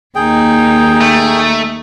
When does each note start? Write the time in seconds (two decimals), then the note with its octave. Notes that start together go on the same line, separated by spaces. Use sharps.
0.15 D#2 A#2 D#4 G#4 G5
1.01 A3